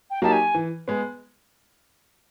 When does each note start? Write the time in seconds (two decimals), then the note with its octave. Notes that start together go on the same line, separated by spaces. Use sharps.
0.10 G5
0.22 F#3 A#3 D#4 G4 A5
0.32 G#5
0.54 E3
0.88 G#3 B3